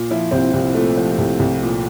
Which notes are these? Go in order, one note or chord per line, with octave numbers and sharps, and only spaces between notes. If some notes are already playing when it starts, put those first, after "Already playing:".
Already playing: A#2
F3 E4
C2 C4
C2
A#2 A3
F3
C2
C2
A#2